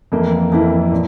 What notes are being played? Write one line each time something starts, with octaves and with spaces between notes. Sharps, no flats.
F2 E3 A#3 E4
F2 E3 A#3 E4
A#2